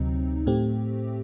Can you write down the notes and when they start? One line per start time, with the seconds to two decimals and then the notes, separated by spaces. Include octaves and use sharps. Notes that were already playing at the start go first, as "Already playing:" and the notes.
Already playing: D2 C3 F#3 C4 D#4
0.46 A2 A3 C4 G4